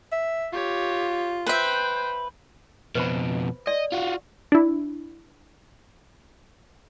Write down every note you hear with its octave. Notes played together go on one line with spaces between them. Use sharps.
E5
F4 G4 C#5
B4 C5 E5 G5
F2 B2 B4 C5 B5
D5 D#5
F4 F#4
D4 E4